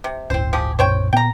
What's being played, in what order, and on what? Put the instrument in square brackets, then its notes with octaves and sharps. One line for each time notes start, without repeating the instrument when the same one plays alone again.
[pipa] C3
[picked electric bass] D1 G1 A2 [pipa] C4 C5
[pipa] F3 G4 G#4
[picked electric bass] B1 F#2 A#2 [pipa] C5 C#5 G5
[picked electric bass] A#2 B3 [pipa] G5 A#5